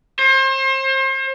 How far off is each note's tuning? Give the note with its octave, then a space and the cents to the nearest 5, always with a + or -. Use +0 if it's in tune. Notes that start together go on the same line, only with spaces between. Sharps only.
C5 +35